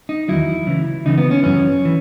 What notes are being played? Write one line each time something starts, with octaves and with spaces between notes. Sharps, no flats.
D#4
E2 D#3 F#3 E4
C#2 C#3 E3
C#2 C#3 E3 D#4
B3
C#4
F#2 E3 C#4
E3